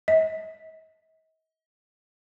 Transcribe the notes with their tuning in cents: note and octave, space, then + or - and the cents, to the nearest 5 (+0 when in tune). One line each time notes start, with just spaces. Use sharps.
D#5 +45